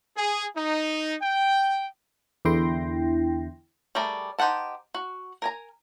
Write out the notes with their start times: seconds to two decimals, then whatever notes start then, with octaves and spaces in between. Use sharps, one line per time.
0.17 G#4
0.56 D#4
1.22 G5
2.45 E2 D3 E4 G5 C6 A#6
3.95 G3 A3 G#4 A#4 D5
4.39 D#4 G4 C5 F#5 A5
4.95 F#4
5.42 A#4 G#5 A#5